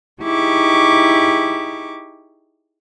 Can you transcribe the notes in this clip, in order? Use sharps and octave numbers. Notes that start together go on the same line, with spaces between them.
D#4 E4 G4 G#4 C#6 D6